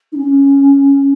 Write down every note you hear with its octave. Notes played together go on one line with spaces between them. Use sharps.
D#4
C#4